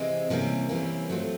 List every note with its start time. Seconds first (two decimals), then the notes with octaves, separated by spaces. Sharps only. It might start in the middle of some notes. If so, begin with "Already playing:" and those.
Already playing: C3 E3 G#3 C4
0.30 C3 E3 G3 A#3 C#4
0.69 C3 E3 G3 A#3 C#4
1.10 F#3 A3 C4 F4